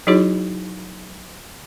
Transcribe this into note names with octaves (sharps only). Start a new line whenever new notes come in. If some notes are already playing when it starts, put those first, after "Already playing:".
F#3 D#4 E4 F#4 G#4 C#5